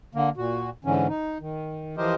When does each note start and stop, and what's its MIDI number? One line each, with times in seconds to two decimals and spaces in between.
0.15 0.30 50
0.15 0.30 58
0.37 0.70 46
0.37 0.70 66
0.85 1.07 44
0.85 1.07 50
0.85 1.07 52
0.85 1.07 61
1.08 1.38 63
1.40 1.96 51
1.97 2.15 52
1.97 2.15 53
1.97 2.15 67
1.97 2.15 70
1.97 2.15 72
1.97 2.15 75